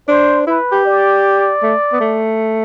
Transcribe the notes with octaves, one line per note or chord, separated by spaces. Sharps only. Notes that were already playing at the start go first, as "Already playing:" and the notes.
D4 C5
E4 B4
G4
D5
A3
B3
A3